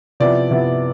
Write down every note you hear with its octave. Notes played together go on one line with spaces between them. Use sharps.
C3 F3 B3 E4 D5
C3 F3 B3 E4